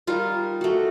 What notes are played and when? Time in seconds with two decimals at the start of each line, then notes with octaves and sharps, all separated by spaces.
0.07 G3 D#4 F4 A#4
0.61 A3 F#4